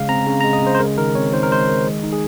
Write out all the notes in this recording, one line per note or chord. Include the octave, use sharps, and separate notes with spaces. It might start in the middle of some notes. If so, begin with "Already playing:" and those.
Already playing: C#3 G#3 F5
C4 A#5
C#3
A#5
G#3
D#5
C#3 C5
C5
G#3 A#4
D#3 A#4
C4 C#5
D#3 C5
A#4
G#3 C5
D#3
G#3
D#4
G#4